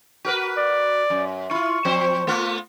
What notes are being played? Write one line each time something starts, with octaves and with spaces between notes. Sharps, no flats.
F#4 A#4 B4
D5
F#2
E4 F4 C#6
F3 C4 C5
A3 B3 F4